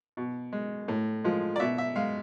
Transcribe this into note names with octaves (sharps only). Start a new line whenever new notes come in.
B2
G#3
A2
F3 G#3
D5
B2 E5
E5
G#3 F5